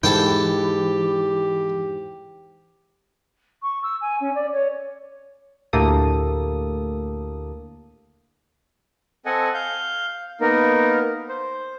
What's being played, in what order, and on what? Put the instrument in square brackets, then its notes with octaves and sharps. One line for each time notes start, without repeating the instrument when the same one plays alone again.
[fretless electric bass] G#2 [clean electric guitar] E3 [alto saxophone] G4 [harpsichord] A4 G5
[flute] C#6
E6
G#5
C#4
D5
C#5
[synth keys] D2 A2 A#3 G4 A4 D#6
[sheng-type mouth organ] C4 A4 D#5 F#5 G#5
F5 G6
A#3 B3 D#4 A#4
C5